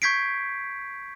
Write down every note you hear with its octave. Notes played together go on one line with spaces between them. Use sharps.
C#6 G6 G#6 B6 C7 D7